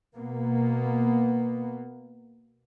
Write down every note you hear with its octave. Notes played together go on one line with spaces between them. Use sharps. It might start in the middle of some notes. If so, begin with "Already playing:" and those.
B2 A#3 B3